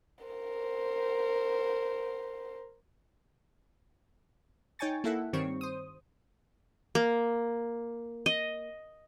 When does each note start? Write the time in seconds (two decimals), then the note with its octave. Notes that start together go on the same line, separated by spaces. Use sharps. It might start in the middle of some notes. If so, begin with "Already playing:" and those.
0.25 A#4 C5
4.79 D#4 C#5 G5 G#5 C#6 A6
5.04 A#3 E4 A4 E5 F#5
5.33 G2 D#3 G3 C4 C#5 C#6
5.61 C5 D#6
6.95 A#3
8.26 D#5